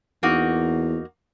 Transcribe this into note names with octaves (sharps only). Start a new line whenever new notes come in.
E2 A#3 D#4 F#4